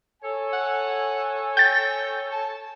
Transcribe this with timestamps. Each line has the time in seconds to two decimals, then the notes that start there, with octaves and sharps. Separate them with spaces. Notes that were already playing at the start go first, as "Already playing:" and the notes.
0.23 A4 C#5 G#5
0.53 F#5
1.57 G5 G6 A6
2.32 A5